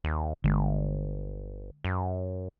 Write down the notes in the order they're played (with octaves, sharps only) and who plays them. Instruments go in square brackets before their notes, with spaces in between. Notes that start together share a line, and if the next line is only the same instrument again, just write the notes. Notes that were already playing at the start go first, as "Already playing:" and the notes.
[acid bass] D#2
[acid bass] G1 [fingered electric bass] D3 G#3
[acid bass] F#2